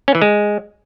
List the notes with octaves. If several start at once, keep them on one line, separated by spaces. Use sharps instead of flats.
C#4
E3
G#3